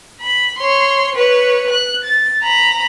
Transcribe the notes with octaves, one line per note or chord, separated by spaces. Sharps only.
B5
C#5 C6
B4 C#5
F#6
A6
A#5 B5